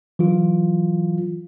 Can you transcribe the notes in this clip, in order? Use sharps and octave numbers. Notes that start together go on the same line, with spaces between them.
E3 F#3 F4